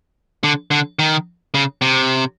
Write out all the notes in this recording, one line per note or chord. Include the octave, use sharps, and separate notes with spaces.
D3
D3
D#3
C#3
C3